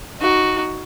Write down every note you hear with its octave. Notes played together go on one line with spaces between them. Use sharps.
D#4 F#4